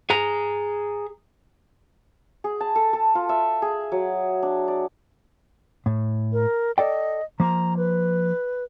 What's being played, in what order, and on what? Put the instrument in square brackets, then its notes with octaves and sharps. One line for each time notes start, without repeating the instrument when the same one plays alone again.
[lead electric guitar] G#4 A#5
[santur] G#4
A5
A4
A4
F4
E5
G#4
F#3
D4
D5
[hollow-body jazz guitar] A2
[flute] A#4
[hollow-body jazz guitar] A4 D5 G5 [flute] D#5
[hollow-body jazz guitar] F3 A#3 [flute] A#5
[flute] B4